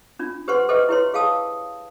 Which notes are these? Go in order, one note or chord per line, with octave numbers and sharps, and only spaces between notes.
C#4 D4 F4
G4 B4 C5 F#5 C6 C#6
A4 B4 C5 D#5 E5 G5
E4 G4 B4 C#5 C6
G#4 F5 G5 A5 D#6 E6